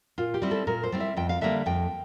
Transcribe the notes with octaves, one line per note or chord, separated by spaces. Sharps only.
A#2 F4
G4
G3 C4 E4
A4
A#2 A#4
C5
G3 C4 E4
E5
F2 G5
F5
D3 G3 A#3 E5
F2 G5